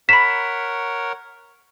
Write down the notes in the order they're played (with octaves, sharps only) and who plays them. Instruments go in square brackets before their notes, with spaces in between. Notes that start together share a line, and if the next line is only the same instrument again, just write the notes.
[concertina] A#4 C#5 F#5 [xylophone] B5 E7 [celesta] B6